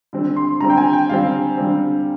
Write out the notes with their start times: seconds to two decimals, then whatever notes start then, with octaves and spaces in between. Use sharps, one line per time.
0.13 D3 G3 C4
0.36 C6
0.60 D3 G3 C4 A#5
0.70 G5
0.77 G#5
0.93 G5
1.08 D3 G3 C4 F5
1.57 D3 G3 C4